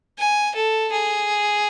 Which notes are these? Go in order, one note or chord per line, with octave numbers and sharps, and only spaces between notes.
G#5
A4
G#4